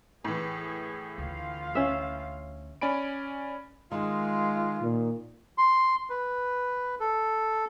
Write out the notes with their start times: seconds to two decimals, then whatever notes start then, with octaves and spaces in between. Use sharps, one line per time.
0.24 A2 E3 G#4
1.18 D2 F4 F5
1.75 C#4 E5
2.81 C#4 D5 G#5 B5 D7
3.92 D#3 G#3 F4
4.82 A#2
5.58 C6
6.10 B4
7.00 A4